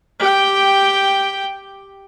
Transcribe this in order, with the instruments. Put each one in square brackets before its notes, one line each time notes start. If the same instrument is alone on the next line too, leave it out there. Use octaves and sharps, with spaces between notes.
[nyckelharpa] G4 G5